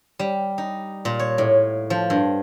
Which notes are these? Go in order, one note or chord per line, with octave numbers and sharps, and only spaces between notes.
G3
D#4
A#2
C#5
A2
F3
G2